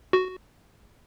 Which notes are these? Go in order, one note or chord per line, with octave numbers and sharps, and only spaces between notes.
F#4